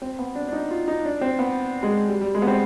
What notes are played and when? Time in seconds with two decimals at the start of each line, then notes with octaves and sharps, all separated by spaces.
0.02 C4
0.19 B3
0.35 D4
0.48 D4
0.53 D#4
0.71 F4
0.88 D#4
1.05 D4
1.21 C4
1.39 B3
1.83 G#3
2.09 G3
2.21 G3
2.35 G#3
2.42 B3
2.47 C4